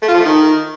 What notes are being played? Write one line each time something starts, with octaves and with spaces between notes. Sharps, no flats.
A3
F4
F3
A3
D#3